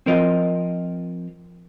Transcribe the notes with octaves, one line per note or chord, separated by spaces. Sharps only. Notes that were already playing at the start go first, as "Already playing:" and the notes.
F3 C4 F4 A#4 D#5